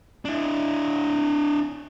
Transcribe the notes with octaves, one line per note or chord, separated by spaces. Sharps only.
D4 E4